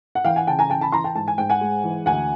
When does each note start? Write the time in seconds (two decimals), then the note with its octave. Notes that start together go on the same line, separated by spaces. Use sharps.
0.15 F#5
0.24 E3 F5 G5
0.36 F#5 G#5
0.47 C#3 G5 A5
0.59 G#5 A#5
0.70 E3 G5 A5
0.81 A5 B5
0.92 E3 A#5 C6
1.04 G5 A5
1.15 G#2 A5
1.28 G#5
1.38 G#2 G5
1.50 F#5 G#5
1.61 G#3
1.84 E3
2.06 D2 F#5 G#5